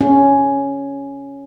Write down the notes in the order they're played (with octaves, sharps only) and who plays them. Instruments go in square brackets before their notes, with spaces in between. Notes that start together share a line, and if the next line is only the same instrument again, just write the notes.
[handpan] C#4